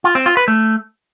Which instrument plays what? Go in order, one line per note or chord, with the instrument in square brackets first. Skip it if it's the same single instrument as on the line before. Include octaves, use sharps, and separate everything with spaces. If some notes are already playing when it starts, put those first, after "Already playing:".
[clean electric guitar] F4
C4
F4
B4
A3